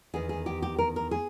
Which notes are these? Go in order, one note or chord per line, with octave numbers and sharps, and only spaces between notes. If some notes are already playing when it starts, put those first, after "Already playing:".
E2 D#3 G#4
G#4
G4
G4
A#4
A#4
G#4